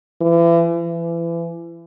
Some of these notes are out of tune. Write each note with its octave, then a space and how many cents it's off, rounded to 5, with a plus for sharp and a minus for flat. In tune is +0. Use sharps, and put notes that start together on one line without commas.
E3 +35
E3 +30